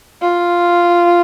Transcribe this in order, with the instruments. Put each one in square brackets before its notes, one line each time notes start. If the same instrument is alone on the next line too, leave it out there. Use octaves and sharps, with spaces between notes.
[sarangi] F4